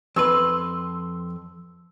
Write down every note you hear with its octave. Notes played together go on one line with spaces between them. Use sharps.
F2 B4 C6 E6